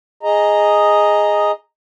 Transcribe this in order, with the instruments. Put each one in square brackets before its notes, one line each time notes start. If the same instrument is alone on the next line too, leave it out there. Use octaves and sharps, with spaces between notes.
[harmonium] G#4 D#5 A#5